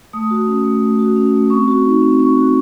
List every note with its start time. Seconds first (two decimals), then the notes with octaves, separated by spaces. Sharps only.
0.13 A3 D#6
0.30 F#4
0.47 C#4
0.64 A3
0.82 A3
0.99 F#4
1.16 C#4
1.33 A3
1.50 C4 C#6
1.68 F#4
1.85 D#4
2.02 C4
2.18 C4 C#6
2.36 F#4